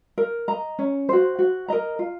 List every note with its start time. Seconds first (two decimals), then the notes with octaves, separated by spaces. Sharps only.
0.18 A#4
0.48 D#5 A#5
0.79 C#4
1.09 F#4 C5
1.39 F#4
1.68 A#4 D#5 A#5
1.99 F4